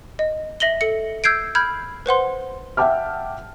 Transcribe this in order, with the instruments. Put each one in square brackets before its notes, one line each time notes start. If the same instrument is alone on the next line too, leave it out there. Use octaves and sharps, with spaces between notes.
[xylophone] D#5
E5 A#6 F#7 G7
A4 C#7
E6 G6 G#6 C7 D7
B5 F6 G6 G#6
B4 C5 F#5 C6
[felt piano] E5 F#5 G5 A5 D6 F6